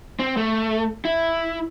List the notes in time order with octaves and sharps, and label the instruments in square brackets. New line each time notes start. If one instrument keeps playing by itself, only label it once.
[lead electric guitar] C4
A3
E4